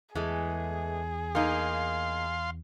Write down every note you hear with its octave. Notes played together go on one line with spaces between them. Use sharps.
E2 E3 G#3 A3 G#4
A#3 D#4 F5 C6